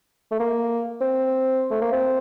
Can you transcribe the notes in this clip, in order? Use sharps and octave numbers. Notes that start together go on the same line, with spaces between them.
A3
A#3
C4
A3
A#3
C4